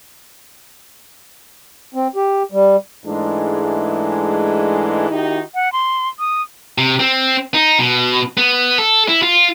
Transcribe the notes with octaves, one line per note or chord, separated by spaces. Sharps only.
C4
G4
G3
G#2 E3 G#3 A3 D4
D#3 D#4 E4 F#4 G4
F#5
C6
D#6
C3
C4
D#4
B2
B3
A4
E4
F4